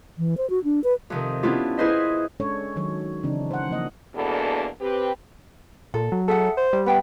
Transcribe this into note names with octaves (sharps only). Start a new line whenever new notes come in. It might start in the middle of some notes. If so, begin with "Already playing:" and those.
E3
C5
F#4
D4
B4
F2 C3 D#3
B3 C#4 D4 E4 F4 G4
E4 G#4 B4 C5 D#5 E5
G#3 C#4 D4 A4 C#5
D#3 F#3 C#5
C#3 E3 C4 D4 D#4
C5 F#5
F3 A#3 D#5
E2 G#2 B2 A#3 D4 A4
C4 G4 B4
A#2 A4
F#3
G#4 A4 E5 F#5
C5
G3
B3 E5 G5 B5